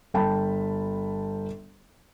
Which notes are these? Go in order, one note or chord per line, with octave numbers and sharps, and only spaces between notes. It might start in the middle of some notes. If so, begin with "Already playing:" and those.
G1 G5 A5 B5